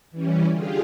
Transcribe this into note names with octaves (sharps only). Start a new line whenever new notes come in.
E3 G3 C#4
D3 F4 G4 G#4